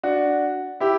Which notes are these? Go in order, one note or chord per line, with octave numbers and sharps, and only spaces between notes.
D4 F#4
E4 G4